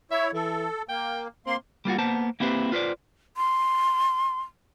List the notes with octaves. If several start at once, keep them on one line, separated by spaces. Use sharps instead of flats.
E4 C#5 E5
E3 A4
A#3 G5
A#3 C4 C6
G3 A#3 F4 F#4
A#3 B3 C5 A5
A#3 C4 E4 G4 B4 C5
F4 B4 C5 D5
C6